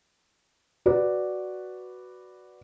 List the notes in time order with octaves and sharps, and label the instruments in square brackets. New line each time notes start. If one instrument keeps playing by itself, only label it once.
[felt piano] F#4 B4 D5